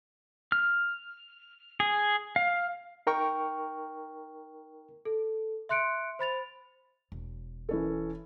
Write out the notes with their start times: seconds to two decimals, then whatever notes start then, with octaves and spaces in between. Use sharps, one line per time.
0.52 F6
1.80 G#4
2.36 F5
3.07 D#4 A#4 G5 C#6
5.05 A4
5.69 E5 C6 F#6 C#7 D7
6.19 C5 B5 A6 F7
7.12 E1
7.69 E3 C#4 A4